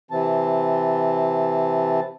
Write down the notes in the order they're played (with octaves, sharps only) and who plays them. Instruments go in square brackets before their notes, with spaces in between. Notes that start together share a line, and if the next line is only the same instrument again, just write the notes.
[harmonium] C3 E3 C4 A5